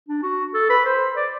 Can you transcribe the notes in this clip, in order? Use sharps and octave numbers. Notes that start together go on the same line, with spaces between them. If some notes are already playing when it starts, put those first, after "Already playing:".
D4
F#4
A4
B4
C5
D5